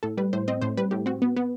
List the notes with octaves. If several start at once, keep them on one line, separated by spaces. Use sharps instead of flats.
A2 A4
G3 B4
A2 C5
C4 D#5
A2 C5
G3 B4
A2 G4
C4 F#4
B3
B3